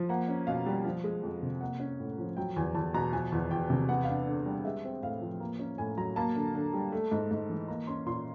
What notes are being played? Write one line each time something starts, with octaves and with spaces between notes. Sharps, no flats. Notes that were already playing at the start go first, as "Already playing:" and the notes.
Already playing: F3
A#3 F#5
C#4
B2 F5
G3
F3
G#3
F2
C3
A#3 F#5
C#4
A2
F3
F#3 G5
E2 G#5
E2 A5
B2 A#5
F3 G#5
E2
E2 G5
C3
B3 F#5
F5
D4 F#5
D3
G3
G#3 E5
C4
A2 F5
F3
A#3
C#4
A2 G#5
F#3 A#5
A#3 A5
D3
D3
G3
A3
G#2
G#2
E3
A#3 A#5
C#4 C6
A#2 C6